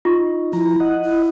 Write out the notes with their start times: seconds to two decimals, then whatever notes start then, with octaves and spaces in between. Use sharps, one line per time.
0.05 D#4 F4 C#6
0.53 F3 E4 A#5
0.80 D#5 F#5
1.03 E4